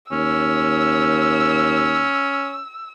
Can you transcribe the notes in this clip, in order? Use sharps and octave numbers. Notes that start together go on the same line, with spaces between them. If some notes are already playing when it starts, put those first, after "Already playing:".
D#2 C#4 E6